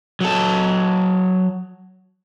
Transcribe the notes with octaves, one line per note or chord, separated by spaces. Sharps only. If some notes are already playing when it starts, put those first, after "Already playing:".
F#3 A4